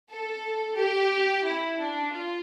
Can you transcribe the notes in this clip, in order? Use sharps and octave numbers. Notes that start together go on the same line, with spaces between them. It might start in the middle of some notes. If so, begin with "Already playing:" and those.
A4
G4
E4
D4
F4